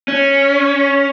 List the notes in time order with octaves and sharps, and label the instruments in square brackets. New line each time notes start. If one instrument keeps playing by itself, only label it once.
[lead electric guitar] C#4